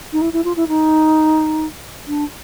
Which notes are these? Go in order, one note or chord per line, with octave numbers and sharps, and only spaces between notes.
D#4
E4
E4
F4
E4
D#4
D4